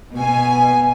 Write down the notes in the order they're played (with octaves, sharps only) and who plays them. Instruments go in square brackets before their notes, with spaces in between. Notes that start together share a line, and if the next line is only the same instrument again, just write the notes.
[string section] B2 G#5